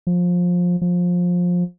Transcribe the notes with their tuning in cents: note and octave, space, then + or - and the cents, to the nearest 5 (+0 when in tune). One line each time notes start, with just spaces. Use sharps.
F3 +20
F3 +20